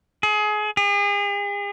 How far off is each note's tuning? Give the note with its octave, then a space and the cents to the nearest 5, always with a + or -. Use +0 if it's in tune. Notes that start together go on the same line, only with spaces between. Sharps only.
G#4 +25
G#4 -40